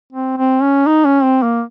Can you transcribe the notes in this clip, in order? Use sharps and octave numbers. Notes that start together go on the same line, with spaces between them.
C4
C4
C#4
D#4
C#4
C4
A#3